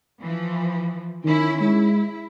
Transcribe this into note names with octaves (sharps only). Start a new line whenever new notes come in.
E3 F3
D#3 C#4 E4
G#3 E4